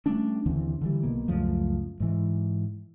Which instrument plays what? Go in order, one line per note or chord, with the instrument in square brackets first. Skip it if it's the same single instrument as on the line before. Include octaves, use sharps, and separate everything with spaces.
[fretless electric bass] G3 A3 C#4 D4
D#2 D3 E3 C4
D3 E3 G3
B1 B2 A#3
C#2 F#2 F3 A3
G#2 E3